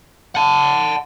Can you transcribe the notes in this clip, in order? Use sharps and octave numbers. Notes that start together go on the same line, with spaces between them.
F#5 A5